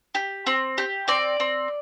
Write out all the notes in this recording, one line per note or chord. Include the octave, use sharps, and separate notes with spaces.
G4
C4
G4
C4 D5
C4